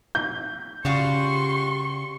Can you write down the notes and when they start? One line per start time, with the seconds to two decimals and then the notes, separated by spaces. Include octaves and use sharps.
0.15 G6
0.85 C#3 G3 F4 F#4 C6 C#6